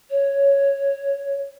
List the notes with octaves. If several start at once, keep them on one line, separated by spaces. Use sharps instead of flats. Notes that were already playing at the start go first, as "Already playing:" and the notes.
C#5